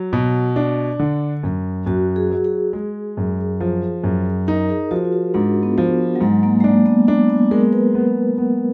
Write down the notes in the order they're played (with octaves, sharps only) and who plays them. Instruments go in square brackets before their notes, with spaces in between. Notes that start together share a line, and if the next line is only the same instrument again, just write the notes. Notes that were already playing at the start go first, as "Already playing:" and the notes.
Already playing: [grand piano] F#3
B2
D4
D3
F#2
[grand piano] F#2 [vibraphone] F#4
[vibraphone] G#4
[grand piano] F#3
[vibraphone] G#4
[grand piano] G#3
F#2
F3
F#2
[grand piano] D#4 [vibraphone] A#4
[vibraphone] G#4
[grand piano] F3 [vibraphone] F#4
[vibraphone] F4
F#4
[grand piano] G#2 [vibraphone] D4
[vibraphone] B3
[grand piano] F3
[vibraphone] F#3
[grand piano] G#2 [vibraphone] G#3
[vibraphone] A#3
G#3
[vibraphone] A#3 [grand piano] D4
[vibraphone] B3
[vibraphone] A#3 [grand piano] D4
[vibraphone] B3
[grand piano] G#3 [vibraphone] A#4
[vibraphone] B4
[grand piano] B3
B3